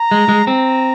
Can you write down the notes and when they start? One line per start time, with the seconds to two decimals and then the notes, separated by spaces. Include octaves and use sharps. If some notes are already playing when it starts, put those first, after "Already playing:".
Already playing: A#5
0.11 G#3
0.29 G#3
0.47 C4 A#5